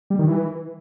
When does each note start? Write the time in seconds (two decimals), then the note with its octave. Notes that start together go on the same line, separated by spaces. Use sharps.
0.10 G3
0.19 D#3
0.27 E3